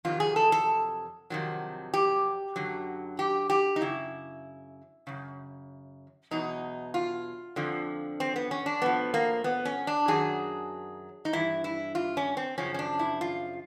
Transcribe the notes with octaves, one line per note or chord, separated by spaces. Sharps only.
F2 C3 D#3 F#3 F4
G#4
A4
A4
F2 C3 D#3 F#3
G4
F#2 D3 F#3
G4
G4
D#4
F#2 C#3 E4
F#2 C#3
E2 B2 F#3 D#4
F4
F2 D3 F3
C4
B3
C#4
D4
A2 F3 B3
A#3
B3
C#4
D4
F#2 D#3 F#3 G#4
D#4
G2 E3 E4
E4
F4
C#4
C4
F#2 C#3 F3 C#4
C#4
D4
E4
F4